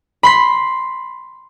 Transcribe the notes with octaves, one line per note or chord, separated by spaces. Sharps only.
B5 C6 B6